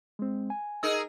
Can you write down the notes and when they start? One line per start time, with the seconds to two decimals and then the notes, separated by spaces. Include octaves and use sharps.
0.19 G#3 C4
0.50 G#5
0.83 D#4 G#4 A#4 E6